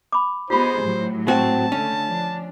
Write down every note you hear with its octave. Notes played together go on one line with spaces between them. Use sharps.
B5 D6
B3 D#4 F4 G4 G#4 C5 B5
A2 F#3
C4 F#4 A5
D3 A3 C#4
F3 D4